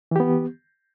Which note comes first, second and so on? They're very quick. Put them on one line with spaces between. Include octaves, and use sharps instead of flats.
E3 G4 B3